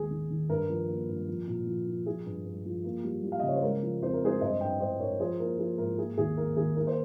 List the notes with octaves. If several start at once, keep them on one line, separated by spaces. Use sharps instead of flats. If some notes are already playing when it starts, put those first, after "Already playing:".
Already playing: D#2 G#3 G#4
D#3
D#3
G2 A#4
F3
A#3
G2
F3
A#2
F3
F3
F3 G#4
G2
G2
F3
A#3
G3
G3
F5
D#5
C#3
C#5
C5
G#3 A#4
F3
F2 C5
A#4
G#3 G#4 C5
G2 C5 D#5
G2 D#5 G5
G2 C5 D#5
G2 A#4 C#5
F3 G#4 C5
A#3 A#4
F3 G#4
G#2 A#4
A#3 G#4
D#2 G#4
A#3 A#4
D#3 G#4
A#3 A#4
C5